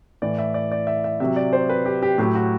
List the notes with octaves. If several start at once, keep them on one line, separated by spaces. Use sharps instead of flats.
A2 E3 D5
E5
D5
D5
E5
E5
C3 F#3 E5
D5
C5
B4
G4
G4
A2 F#3 G4
F#4